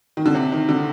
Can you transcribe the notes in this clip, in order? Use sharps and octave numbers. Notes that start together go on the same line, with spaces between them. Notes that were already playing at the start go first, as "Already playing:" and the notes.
D#3
D3
C3
D#3
D3